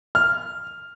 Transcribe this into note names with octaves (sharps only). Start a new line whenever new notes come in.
F6